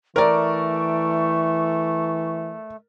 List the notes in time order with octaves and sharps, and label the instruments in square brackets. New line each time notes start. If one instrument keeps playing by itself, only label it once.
[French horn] E3 [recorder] A3 [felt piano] A#4 D5 [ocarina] C#6